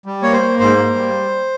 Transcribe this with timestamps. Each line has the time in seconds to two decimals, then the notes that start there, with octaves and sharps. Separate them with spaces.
0.06 G3
0.23 A#3 C#5
0.33 C5
0.41 A#3
0.59 G#2 C5
0.77 A#3
0.95 G3